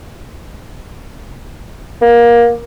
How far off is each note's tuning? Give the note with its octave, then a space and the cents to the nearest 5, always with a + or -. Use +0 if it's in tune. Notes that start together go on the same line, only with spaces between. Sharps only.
A#3 +20